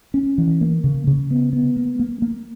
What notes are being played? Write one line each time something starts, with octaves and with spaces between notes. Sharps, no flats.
C#4
E3
A#3
C#3
C#3
B3
B3
A#3
A#3
A#3